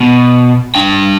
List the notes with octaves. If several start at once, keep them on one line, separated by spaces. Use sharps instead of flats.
B2
D4 G5